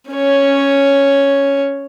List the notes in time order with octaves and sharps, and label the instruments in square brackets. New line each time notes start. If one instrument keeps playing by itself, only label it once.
[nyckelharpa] C#4 C#5